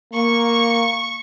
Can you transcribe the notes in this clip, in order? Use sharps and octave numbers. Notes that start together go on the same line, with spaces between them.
A#3 C#6